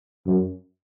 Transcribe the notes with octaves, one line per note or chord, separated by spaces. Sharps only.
F#2